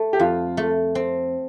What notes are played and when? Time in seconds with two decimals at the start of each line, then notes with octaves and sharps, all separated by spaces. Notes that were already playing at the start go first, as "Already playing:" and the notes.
Already playing: A3
0.13 G4
0.20 F2 F4
0.57 A3
0.95 C4